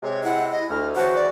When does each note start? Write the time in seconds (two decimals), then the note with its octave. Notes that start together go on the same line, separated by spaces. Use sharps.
0.03 C3 G#3 C#5
0.24 E4 F#5
0.51 D#5
0.70 D2 F6
0.96 C#3 E3 F#4 C5 A5
1.14 D5